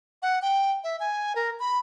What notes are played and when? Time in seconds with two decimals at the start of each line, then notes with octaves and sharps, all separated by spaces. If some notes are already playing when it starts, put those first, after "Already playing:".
0.22 F#5
0.42 G5
0.84 E5
1.00 G#5
1.36 A#4
1.60 B5